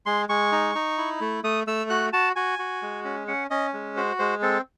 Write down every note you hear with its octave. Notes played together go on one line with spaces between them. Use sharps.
G#3 C6
G#3 C#6
D#4
D#4
E4
A3
A3 D#6
A3 E6
F#4 F#6
F#4 A5
F#4 G#5
F#4
G#3
C#4
C#4 F#5
C#4 D#5
G#3
F#4 C5
G#3 C5
C4 A4